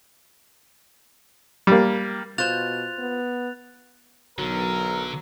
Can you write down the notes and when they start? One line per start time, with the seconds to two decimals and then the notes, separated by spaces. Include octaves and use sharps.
1.67 G3 A#3
2.38 B2 F4 C5 F#6 A6 F7
2.99 B3
4.38 B1 D3 F#3 A#4